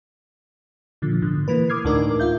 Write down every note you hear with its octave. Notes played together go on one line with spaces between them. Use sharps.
A#2 D3 F3
G#2 B2 D3
E3 A#3 B4
D6 D#6 F6 G#6 C7
D2 A2 D4 D#4 A#4 D6
F4 E5 G6